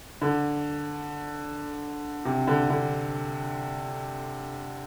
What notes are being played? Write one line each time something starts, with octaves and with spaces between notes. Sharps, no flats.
D3
C3
D3
D3